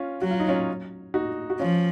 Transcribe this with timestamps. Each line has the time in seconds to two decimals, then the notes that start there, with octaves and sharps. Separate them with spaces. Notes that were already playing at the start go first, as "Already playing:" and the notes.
Already playing: C#4 F4
0.22 F#3 F#4
0.31 F4
0.40 D#4
0.48 C#4 F4
1.14 D#4 F#4
1.50 F#4
1.60 F3 C#4 F4